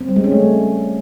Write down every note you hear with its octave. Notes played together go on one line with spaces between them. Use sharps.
C4
G3
G#3
C#4
A3